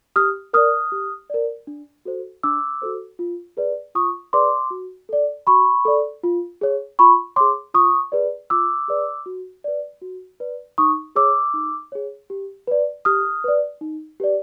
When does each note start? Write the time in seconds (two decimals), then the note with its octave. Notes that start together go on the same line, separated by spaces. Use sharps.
0.16 G4 D#6 F6
0.53 A#4 D5 D#6 F6
0.92 G4
1.30 A#4 D5
1.67 D4
2.05 F#4 A4 C5
2.43 D4 D6 E6
2.82 F#4 A4 C5
3.19 F4
3.57 G#4 B4 D5
3.95 F4 C#6 D#6
4.33 G#4 B4 D5 C6 D6
4.71 F#4
5.09 A4 D5
5.47 F#4 B5 C#6
5.85 A4 D5
6.23 F4
6.61 G#4 C#5
6.99 F4 B5 C#6
7.36 G#4 C#5 C6 D6
7.74 F4 C#6 D#6
8.12 G#4 B4 D5
8.50 F4 D6 E6
8.88 G#4 B4 D5
9.26 F#4
9.64 B4 D5
10.02 F#4
10.40 B4 D5
10.78 D#4 C#6 D#6
11.16 G#4 C#5 D6 E6
11.54 D#4
11.92 G#4 C#5
12.30 G4
12.67 B4 D5
13.05 G4 D#6 F6
13.44 B4 D5
13.81 D#4
14.20 G4 B4 D5